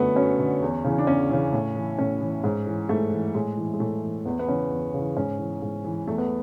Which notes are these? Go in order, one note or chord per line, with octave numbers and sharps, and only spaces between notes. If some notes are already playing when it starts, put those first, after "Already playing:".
Already playing: F#2 D3 A3 B3
F#2 C#4
D3
E2
C#3 E3
D4
E2 C#4
C#3 E3
A2
E3
A2 C#4
E3
G#2
E3
G#2 A3
E3
A2 G#3
E3
G#3
A2 A3
E3
E2 B3
B3
C#3 E3 C#4
E2
C#3 E3
G#2 C#4
E3
G#2
E3
E2 A3
B3